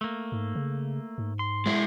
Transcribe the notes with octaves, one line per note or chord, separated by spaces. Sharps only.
A3 A#3
G#2
C#3
G#2
C6
G#3 E4